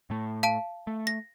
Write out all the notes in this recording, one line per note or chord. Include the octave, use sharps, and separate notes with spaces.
A2 A3
F5 A5 D7
A3
A#6